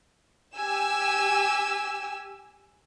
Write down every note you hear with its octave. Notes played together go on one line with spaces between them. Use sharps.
G4 G#5 E6